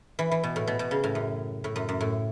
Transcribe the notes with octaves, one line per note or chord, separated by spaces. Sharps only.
E3
E3
B2
A2
B2
B2
C#3
A2
F#2
A2
F#2
F#2
A2